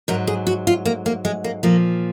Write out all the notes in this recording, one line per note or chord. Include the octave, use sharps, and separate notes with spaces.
G#2 F#3 A#4
G#4
F#4
F4
A#3
A#3
G#3
A#3
A#2 F3 A#3